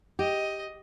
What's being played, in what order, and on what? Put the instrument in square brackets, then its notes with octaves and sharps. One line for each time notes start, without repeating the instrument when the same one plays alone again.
[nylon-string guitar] G4 [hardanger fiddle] D#5